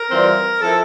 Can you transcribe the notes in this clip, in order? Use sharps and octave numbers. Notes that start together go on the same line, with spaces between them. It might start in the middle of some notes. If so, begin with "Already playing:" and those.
Already playing: A#4
E3 G3 C4 F4
F3 C4 E4 A4